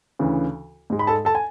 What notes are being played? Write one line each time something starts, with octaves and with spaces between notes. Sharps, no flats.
D2 C#3 E3
G#2 G#3
B5
A4 A5
A4 A5
G#5